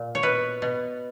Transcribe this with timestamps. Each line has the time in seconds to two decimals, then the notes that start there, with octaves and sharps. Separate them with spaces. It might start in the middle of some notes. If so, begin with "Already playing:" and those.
Already playing: A#2
0.15 C#5
0.23 B2 B4
0.62 B2